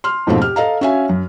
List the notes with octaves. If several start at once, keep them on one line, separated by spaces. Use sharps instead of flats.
C6 F6
F2 G#2 B2 A3 C4 F4
G4 F6
A4 D#5 F5 A#5
C#4 F#4 E5 F5 G#5
F#2